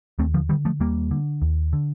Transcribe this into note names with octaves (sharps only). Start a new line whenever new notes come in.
D#2 A3 C4
D3 F3
D3 D#3 G3
F3 A3
D#2 G3 A#3
D3
D#2
D3